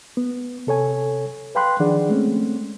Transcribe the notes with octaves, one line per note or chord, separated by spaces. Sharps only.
B3
C3 A4 C#5 G#5
B4 F5 G5 B5 C6 F#6
D#3 F3 D4 G#4 D5 F#5
G#3 A3 C4 C#4